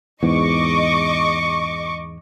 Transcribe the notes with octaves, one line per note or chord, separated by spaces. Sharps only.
E2 G#2 D#5 C#6 D6